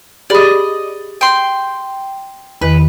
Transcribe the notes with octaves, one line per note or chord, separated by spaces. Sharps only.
G4 G#4 D5 D#5 B5
G5 C6
E2 D#3 B4